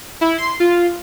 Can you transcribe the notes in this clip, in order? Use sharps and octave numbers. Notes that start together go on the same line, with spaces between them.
E4
C6
F4